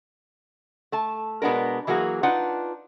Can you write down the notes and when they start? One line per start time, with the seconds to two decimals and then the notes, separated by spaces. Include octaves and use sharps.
0.92 A3 A5
1.42 B2 G#3 B3 D4 A#4
1.87 E3 F#3 A#3 F#4 G#4
2.23 D4 D#4 F4 B4 F#5